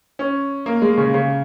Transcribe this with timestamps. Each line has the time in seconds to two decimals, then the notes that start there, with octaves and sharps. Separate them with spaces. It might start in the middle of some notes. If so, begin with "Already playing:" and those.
0.19 C#4
0.66 A#3
0.82 G#3
0.98 C#3
1.14 C#3